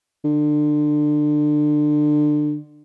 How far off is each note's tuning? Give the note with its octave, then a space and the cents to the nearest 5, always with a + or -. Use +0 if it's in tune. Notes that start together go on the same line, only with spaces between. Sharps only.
D3 +25